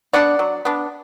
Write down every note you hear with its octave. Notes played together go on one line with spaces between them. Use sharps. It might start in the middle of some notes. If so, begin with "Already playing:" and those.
B3 D4 D5 F#5
F#3
B3 D4